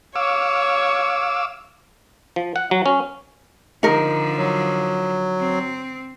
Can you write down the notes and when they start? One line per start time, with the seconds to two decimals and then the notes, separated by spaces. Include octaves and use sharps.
0.16 C#5 F5 D6 E6
2.36 F3
2.56 F#5
2.71 F#3
2.86 C#4
3.83 D3 F3 D#4 A#4
4.37 F#3
5.40 C4